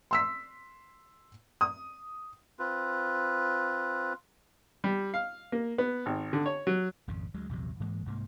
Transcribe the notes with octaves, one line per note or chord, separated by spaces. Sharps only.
C6 E6 B6
D#6
C4 F4 B4
G3
F5
A#3
B3
G#1
D3
C#5
F#3
G#1 F2 C#3
D2 F#3 G#3
A#1 E2 C3 F#3
G#2 E3 G#3 A#3
C2 G#2 F#3 A#3